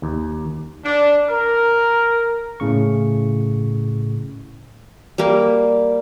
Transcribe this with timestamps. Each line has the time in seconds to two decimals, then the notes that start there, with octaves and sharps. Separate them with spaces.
0.02 D#2
0.85 D4
1.29 A#4
2.60 A2 C#3 C#6
5.18 G3 A#3